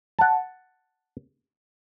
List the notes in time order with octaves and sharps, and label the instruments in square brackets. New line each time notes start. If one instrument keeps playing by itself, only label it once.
[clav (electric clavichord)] F#5 A5